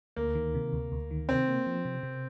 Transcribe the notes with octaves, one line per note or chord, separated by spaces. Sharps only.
D2 A#3
D#3
C3
D2
D2
D#3
C3 C4
A#3
F3
C3
C3